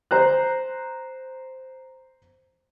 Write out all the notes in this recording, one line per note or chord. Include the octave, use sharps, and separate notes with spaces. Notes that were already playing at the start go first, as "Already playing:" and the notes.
C5 A#5 F#6